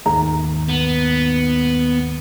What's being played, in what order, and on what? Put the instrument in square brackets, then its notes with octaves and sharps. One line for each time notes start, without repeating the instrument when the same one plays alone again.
[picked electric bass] D#2 G#2 D#3 [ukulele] A#5
[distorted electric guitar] B3